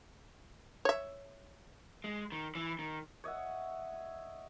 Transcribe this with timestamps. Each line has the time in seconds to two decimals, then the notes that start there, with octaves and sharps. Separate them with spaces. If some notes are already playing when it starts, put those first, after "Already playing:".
0.85 C#5 E5
2.04 G#3
2.32 D#3
2.55 E3
2.79 D#3
3.24 C#5 D#5 E5 F#5